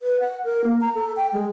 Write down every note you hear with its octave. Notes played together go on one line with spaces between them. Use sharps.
B4
F#5
A#4
A#3
A#5
A4
G5
G#3